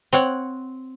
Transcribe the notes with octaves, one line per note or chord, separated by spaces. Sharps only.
C4 C#5 F#5